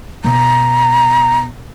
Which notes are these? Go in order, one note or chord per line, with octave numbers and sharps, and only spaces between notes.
B2 A#5